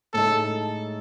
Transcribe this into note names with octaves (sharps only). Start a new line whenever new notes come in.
A2 G#3 D#4 A4